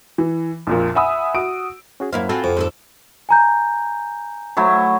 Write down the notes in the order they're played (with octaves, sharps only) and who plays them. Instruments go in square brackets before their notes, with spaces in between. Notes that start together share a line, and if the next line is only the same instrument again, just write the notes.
[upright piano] E3
A#1 F2 A#2
E5 F#5 G#5 B5 D#6 E6
F#4 D#6 D7
[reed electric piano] C#4 F#4 G#4
[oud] F#2 E4 F5 [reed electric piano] A#3 C5
[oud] C4 F4 F#4 [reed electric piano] A4 G#5
[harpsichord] F2
[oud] D#2 G#4 A4 [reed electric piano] C5
[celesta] G#5 A#5 G6
[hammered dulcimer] F#3 A3 E4